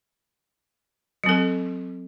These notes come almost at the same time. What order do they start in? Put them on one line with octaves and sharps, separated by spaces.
F#3 C4 A4